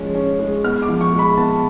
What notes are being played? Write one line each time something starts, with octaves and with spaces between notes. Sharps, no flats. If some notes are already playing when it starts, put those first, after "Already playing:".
Already playing: F3 G#3 C#4
C#4
G#3
B3 F6
D6
F3
C#6
G#3
B5
B3 A5